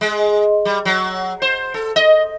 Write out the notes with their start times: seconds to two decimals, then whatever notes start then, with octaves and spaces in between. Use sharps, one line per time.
0.01 G#3
0.65 G3
0.85 F#3
1.42 C5
1.74 A4
1.96 D#5